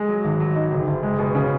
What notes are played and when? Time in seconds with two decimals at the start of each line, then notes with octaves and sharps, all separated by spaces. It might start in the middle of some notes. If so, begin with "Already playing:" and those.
Already playing: G#3
0.09 F#3
0.24 G#1
0.40 F#3
0.56 D#4
0.72 F#1
0.87 F#1
1.03 G#3
1.19 B2
1.35 C#3